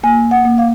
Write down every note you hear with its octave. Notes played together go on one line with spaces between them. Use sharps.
A#3 G#5
F#5
A#3
F5